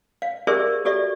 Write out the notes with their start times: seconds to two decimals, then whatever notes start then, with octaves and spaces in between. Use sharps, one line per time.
0.22 F5
0.47 G4 G#4 A#4 C5 D5 E5
0.85 F#4 G4 A4 D5 E5